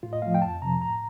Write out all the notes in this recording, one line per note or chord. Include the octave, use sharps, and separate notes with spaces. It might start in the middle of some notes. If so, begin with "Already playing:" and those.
A2 F4
D#5
F3 A3 F5
G5
F2 A5
C3 F3 A#5
A2 A#5